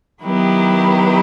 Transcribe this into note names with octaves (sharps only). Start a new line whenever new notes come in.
D#3 F#3 B3 E4 G4